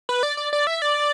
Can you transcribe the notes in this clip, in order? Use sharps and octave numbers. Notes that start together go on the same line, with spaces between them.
B4
D5
D5
D5
E5
D5